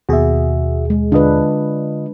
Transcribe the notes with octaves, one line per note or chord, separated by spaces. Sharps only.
D#2 B2 F#4 G#4 E5
G#3
D3 D4 F4 B4 D#5